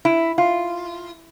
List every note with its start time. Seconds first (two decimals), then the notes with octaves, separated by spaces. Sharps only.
0.05 E4
0.38 F4